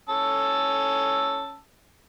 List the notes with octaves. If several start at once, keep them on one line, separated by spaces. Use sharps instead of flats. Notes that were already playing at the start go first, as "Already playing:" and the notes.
C#4 A5 E6